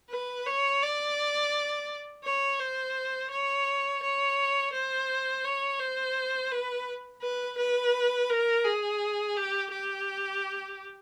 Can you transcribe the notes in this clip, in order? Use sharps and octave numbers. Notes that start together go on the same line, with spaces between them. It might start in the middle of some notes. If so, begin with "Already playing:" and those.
B4
C#5
D5
C#5
C5
C#5
C#5
C5
C#5
C5
B4
B4
B4
A#4
G#4
G4
G4